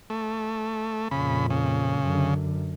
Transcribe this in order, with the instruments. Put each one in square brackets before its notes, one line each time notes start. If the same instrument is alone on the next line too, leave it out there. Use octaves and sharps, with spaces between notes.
[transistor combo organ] A3
[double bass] F2 A#2 [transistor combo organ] C#3 B5
[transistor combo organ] C#3
[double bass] F#2 D3